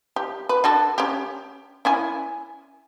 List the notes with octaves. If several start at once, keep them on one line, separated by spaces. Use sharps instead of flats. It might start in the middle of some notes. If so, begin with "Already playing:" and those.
G4
B4
D4 F#4 A4
C#4 G4
C#4 E4 G#5